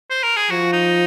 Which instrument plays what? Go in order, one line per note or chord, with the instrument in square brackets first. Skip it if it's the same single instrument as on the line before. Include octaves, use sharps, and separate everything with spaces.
[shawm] C5
A#4
G#4
[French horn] F3 [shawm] F#4
[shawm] D#4